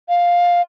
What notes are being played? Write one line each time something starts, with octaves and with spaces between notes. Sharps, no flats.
F5